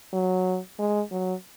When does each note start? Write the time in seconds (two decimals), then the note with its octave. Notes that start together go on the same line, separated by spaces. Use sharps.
0.13 F#3
0.79 G#3
1.11 F#3